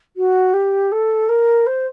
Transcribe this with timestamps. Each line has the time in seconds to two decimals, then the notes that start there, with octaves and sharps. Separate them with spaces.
0.16 F#4
0.53 G4
0.92 A4
1.29 A#4
1.66 C5